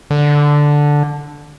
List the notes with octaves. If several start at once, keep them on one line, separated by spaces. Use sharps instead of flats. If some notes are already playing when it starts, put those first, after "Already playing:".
D3